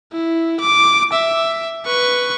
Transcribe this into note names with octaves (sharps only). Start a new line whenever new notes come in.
E4
D6
E5
B4 C#6